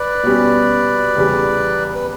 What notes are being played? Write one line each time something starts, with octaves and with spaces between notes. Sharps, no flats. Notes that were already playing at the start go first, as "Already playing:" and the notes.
Already playing: B4 D5
B2 G3 C#4
E2 C#3 G3
B4